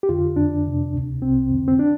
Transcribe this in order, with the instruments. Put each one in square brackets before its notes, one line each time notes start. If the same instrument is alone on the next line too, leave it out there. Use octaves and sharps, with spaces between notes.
[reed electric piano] G4
F2 D3 F4
F2 D3 D4
F2 C3
D2 C3
C2 C3 C4
F2 D3
C4
D4